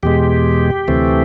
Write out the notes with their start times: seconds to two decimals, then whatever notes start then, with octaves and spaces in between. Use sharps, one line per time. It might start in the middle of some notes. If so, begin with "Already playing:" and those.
0.03 E2 B2 G#3 G4
0.88 D2 C3 E3 A3 C4